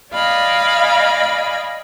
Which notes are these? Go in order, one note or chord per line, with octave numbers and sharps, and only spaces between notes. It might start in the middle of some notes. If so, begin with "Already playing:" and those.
D5 D#5 F5 G#5 B5